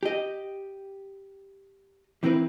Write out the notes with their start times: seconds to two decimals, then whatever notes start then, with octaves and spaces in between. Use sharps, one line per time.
0.03 G4 D#5
2.23 E3 C4 E4 A#4 B4